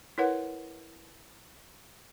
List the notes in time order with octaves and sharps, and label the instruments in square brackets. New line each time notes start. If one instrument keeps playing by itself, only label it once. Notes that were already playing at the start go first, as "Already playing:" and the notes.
[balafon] E4 A#4 B4 C#5 F#5